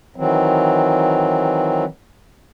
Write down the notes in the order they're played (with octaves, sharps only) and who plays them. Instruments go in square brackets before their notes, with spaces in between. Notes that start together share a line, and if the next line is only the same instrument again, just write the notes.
[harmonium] D#3 E3 F#3 C4